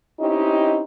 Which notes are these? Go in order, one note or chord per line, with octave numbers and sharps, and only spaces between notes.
C4 C#4 D#4 E4 G4 D#5